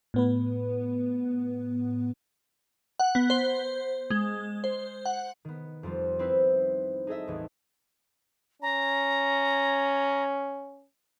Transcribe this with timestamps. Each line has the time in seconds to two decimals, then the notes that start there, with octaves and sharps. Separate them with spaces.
0.14 A2 B3 B4
2.99 F#5
3.15 B3
3.30 C5
4.10 G#3
4.64 C5
5.06 F#5
5.45 D#3 B3
5.83 F2 F3 G3 F4
6.19 C4 D#4 E4 B4 C5
7.07 D#4 G#4 A4 D#5 E5
7.28 A1 E2
8.62 C#4 A#5